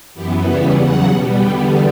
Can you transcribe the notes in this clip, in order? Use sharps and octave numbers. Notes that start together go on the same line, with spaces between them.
F#2 E3 B3 G4
E2 C#3 E3 G3 B3 E5
E2 C#3 F#3 F#5
B2 G3 B3
E2 D3 G3 B3 G5